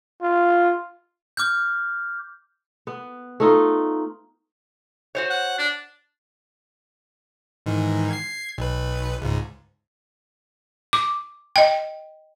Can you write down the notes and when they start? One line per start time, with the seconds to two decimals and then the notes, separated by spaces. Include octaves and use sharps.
0.21 F4
1.37 D6 F6 G6
2.87 B3
3.40 A3 D#4 F4
5.15 F#4 C5 C#5
5.30 F#5
5.59 D4
7.66 G#2 D#3 E3
8.11 G#6 C7
8.58 B1 B4
9.21 C#2 G#2
10.93 D6
11.56 D#5 G5